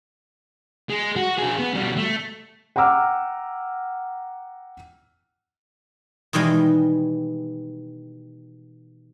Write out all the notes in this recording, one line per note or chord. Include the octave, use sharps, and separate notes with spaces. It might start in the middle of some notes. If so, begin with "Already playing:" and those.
G#3
F#4
D4 G#4
B3
B2 G3
A3
F#5 G5 A#5 D6 E6 F6
B2 D#3 E3 G3 G#3